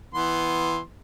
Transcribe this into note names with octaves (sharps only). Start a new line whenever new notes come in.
E3 B3 C6